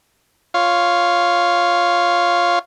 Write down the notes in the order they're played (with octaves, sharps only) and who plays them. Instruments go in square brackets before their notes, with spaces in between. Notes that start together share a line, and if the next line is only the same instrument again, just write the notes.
[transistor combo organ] F4 C#5 F5